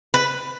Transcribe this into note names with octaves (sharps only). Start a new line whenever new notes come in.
B4